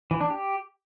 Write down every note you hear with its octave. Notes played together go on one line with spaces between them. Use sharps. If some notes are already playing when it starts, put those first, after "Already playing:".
E3
D4
G4